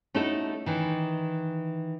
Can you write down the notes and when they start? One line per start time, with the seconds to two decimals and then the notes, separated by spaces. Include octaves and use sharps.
0.14 A3 C#4 D#4 E4 F#4 A4
0.66 D#3 E3